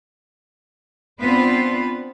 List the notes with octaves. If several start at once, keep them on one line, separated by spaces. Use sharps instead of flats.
B3 C4 D4 F4 B4 C5